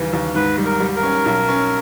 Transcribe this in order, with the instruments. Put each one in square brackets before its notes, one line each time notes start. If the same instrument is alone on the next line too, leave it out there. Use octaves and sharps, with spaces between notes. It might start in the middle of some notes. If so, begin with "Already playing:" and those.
Already playing: [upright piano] D#2 C#3 E3 G3
D#2
[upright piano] G#2 [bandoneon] B4
[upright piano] G3
[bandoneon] A#4
[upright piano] G3
[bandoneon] A#4
[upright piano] C#4
B1
C#4